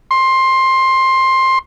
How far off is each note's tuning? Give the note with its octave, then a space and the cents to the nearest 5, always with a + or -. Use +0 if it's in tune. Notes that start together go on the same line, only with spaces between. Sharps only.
C6 +15